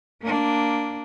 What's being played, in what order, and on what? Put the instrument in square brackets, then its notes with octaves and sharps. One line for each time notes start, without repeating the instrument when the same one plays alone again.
[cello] A#3 D4